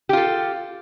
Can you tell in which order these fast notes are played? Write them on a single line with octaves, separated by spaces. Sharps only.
G4 F4 A4